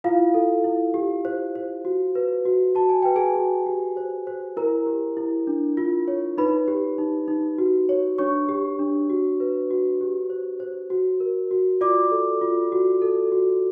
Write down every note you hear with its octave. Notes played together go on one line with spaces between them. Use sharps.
E4 F4 F5
A4
E4
G4
C5
C5
F#4
B4
F#4
F#4 A5
G#5
B4 G5
G#4 G#5
F#4
G4
C5
C5
E4 A#4 A#5
G4
E4
D4
F4
C#5
D#4 B4 B5
G4
D#4
D#4
F#4
C#5
D4 C#5 C#6
G4
D4
F#4
B4
F#4
G4
C5
C5
F#4
A#4
F#4
F4 D5 D6
A4
F4
F#4
A4
F#4